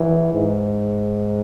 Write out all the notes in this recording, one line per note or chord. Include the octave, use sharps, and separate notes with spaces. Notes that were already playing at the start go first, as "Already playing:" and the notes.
Already playing: E3
G#2